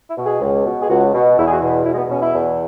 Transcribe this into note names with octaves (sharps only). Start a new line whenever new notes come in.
E4
B2
G#4
C#2
B2
G#4
C#2 F#4
B2
E2 E4
G#4
F#4
B2
B3
E2 E4
G#3
B3
B2 C#4
E4
E2